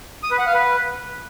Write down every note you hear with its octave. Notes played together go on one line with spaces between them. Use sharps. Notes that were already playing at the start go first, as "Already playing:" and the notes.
D#6
B4
F#5
F5
B4